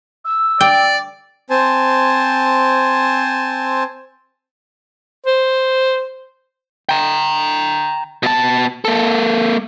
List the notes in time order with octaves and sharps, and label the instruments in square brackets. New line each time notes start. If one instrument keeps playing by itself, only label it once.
[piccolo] E6
[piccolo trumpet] D5 [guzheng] G5
[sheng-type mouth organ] C4 C5 G#5 A5
[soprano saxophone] C5
[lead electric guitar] G5 A#5
B2 A5
A#3 A4